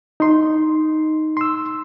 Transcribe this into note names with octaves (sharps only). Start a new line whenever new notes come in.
D#4 C6
C6 E6